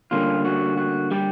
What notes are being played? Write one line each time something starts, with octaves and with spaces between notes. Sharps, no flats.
D3 G3 A#3 C#4 F4
F#4
F#4
G3 G4